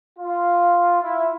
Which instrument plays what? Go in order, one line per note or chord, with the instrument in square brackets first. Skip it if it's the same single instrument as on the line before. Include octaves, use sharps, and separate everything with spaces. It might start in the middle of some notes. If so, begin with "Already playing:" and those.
[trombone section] F4
E4